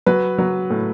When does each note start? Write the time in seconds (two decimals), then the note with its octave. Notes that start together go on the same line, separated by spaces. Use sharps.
0.06 F#3 B4
0.38 F#3
0.70 A2